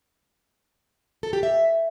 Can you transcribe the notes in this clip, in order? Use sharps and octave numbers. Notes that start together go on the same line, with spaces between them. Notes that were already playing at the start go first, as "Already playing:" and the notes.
A4
G4
E5